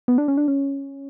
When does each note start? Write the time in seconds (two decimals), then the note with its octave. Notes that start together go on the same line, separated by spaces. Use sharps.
0.08 B3
0.18 D4
0.28 C#4
0.37 D4
0.48 C#4